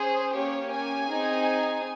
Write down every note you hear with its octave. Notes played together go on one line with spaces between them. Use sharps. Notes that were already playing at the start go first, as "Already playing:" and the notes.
Already playing: C#4 G#4 C5
A#3 C#4 G4 C#5
G#5
C4 D#4 G#4